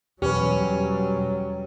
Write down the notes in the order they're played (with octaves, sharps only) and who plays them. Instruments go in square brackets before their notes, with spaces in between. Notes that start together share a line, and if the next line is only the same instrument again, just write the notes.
[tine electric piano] E2 B2 [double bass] F#3 G3 [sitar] C#4 [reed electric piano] G4 B4